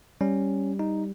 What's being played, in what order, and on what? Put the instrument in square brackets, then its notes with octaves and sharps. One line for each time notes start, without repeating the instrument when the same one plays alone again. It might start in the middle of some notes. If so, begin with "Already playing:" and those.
[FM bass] G3 [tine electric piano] C#4
[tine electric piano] D#4